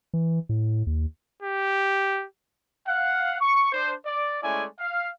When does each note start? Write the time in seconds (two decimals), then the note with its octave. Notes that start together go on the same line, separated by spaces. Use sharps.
0.14 E3
0.49 A2
0.87 D#2
1.42 G4
2.88 F5 F#5
3.41 C#6
3.72 D4 C5
4.06 D5
4.43 G#3 A3 C#4 E4 D5 G#5
4.80 F5